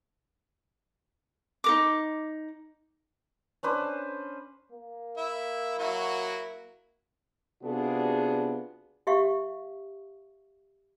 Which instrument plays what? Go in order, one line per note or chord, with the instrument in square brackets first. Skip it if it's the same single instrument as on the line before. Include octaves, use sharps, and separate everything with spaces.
[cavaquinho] D#4 A#4 D6
[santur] C#4 D4 B4 C5
[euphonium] A#3
[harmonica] E4 E5
F#3 E4 F#4
[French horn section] C3 B3 D4 F4 F#4 G#4
[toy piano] G4 E5 F5 C#6